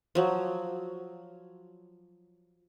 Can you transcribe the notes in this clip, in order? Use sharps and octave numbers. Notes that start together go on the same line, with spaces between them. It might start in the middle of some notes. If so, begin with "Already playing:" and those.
F3 F#3